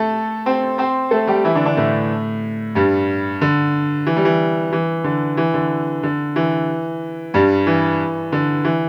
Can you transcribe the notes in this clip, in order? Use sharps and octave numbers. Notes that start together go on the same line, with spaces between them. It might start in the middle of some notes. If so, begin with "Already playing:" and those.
Already playing: A3 A4
C4 C5
C4 C5
A3 A4
G3 G4
E3 E4
D3 D4
D3 D4
A2 A3
G2 G3
D3
E3
G3
E3
E3
D3
E3
D3
D3
E3
G2 G3
E3
D3
E3